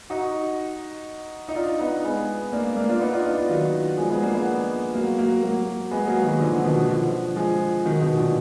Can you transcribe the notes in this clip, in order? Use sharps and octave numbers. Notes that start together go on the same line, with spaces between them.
D#4 F#4
D#4
D4 F4
B3 D#4
G#3 B3
A#3 D4
A#3 D4
D4 F4
B3 D#4
D4 F4
D4 F4
D4 F4
D#3 F#3
F3 G#3
G#3 B3
A#3 D4
G#3 B3
F#3 A#3
F#3 A#3
F#3 A#3
G#3 B3
F#3 A#3
D#3 F#3
D3 F3
B2 D#3
D3 F3
F3 G#3
D#3 F#3
B2 D#3
A#2 D3